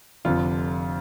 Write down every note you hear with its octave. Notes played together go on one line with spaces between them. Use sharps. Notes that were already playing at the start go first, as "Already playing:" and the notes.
F1 F2 D3 F4